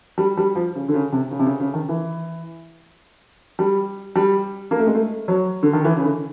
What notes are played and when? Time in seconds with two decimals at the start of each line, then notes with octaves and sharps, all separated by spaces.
0.18 G3
0.37 G3
0.55 F3
0.75 C#3
0.88 D3
0.94 C#3
1.12 C3
1.31 C#3
1.39 C3
1.46 C#3
1.60 C#3
1.74 D#3
1.89 E3
3.59 G3
4.16 G3
4.71 A#3
4.79 A3
4.87 G#3
4.95 A3
5.28 F#3
5.63 D3
5.73 D#3
5.84 E3
5.97 C#3
6.04 D3